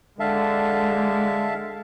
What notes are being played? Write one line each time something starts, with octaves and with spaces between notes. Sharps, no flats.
D3 G#3 E5 F5 A5